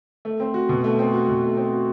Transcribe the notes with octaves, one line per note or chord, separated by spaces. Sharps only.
A3
C4
F#4
B2
A3
C4
F#4
B2
A3
C4
F#4